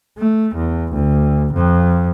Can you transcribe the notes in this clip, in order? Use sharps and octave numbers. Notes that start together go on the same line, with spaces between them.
A3
E2
D2
F2